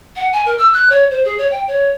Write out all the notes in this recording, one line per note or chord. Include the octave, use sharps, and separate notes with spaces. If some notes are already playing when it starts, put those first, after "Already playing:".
F#5
G#5
A#4
E6
F#6
C#5
C5
G#4
C#5
G5
C#5